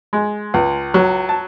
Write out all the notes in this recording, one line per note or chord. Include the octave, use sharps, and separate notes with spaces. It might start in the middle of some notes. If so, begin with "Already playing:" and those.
G#3
C#2
F#3
A5